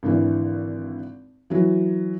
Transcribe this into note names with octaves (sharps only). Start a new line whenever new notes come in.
G#1 D3 E3
E3 F#3